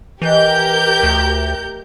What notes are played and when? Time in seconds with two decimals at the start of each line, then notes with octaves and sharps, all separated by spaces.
0.22 D#3 E3 D#4 G4 A#4 G6
1.03 D2